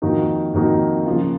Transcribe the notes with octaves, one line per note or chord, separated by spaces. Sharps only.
F2 D#3 A#3 D#4 F#4
F2 D#3 A#3 D#4 F#4
C#3 F3 A#3 F4